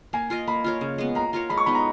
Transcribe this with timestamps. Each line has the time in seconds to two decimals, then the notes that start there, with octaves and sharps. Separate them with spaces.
0.13 A#3 G#5
0.30 F4 A#4 D#5
0.47 A#3 B5
0.64 F4 A#4 C#5
0.81 C#3
0.98 G#3 B3
1.15 A#3 A#5
1.33 F4 A#4 C#5
1.49 G#3 B5
1.58 C#6
1.66 B3 D#4 B5
1.75 A#5